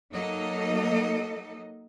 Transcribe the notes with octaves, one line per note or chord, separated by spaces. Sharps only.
F#3 A#3 D#4 A4 D#5